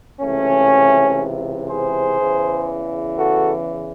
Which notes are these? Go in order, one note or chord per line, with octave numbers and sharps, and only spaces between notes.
C#2 C3 E3 A3 C#4
G#4 C5
E2 C#3 E3
F#4 A4